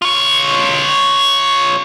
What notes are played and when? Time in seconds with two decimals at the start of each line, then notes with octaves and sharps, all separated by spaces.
0.02 F4 C#5